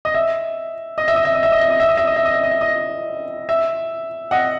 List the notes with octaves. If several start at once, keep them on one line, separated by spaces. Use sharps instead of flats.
D#5
E5
D#5
E5
D#5
E5
D#5
E5
D#5
E5
D#5
E5
D#5
E5
D#5
E5
D#5
E5
D#5
E5
D#5
E5
D#5 F#5